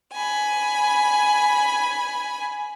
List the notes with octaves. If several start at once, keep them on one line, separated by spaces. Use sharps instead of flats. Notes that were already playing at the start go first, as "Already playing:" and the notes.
G#5 B5